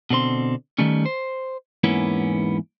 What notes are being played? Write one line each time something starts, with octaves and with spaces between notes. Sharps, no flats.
B2 D3 C4 C6
D#3 G3 A3 C#4
C5
E2 G#2 A#3 B3 C#4 E4